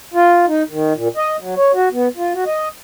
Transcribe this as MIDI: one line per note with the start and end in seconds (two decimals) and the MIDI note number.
0.14 0.46 65
0.48 0.63 63
0.70 0.93 51
0.95 1.08 46
1.17 1.37 75
1.39 1.55 54
1.57 1.72 73
1.74 1.89 66
1.92 2.08 59
2.17 2.33 65
2.34 2.44 66
2.46 2.68 75